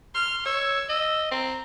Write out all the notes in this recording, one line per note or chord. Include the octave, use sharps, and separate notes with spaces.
C6 F6
C#5 E6
D#5 E6
C4 A#5